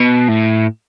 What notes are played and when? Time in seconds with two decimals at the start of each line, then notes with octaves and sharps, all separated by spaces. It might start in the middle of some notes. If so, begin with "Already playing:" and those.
Already playing: B2
0.29 A2